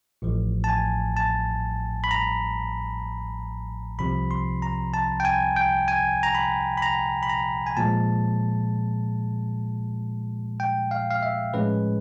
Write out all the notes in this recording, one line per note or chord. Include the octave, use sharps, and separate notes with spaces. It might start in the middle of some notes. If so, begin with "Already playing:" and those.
A1 A2 F3
A5
G#5
A5
B5
A#5
C2 C3 F3 B5
C6
A#5
A5
G5
G#5
G5
G#5
A#5
B5
B5
A#5
B5
A#5
G#5
A#2 F3 G#3 A5
G5
F5
F5
E5
A2 F3 G#3 C#4 B4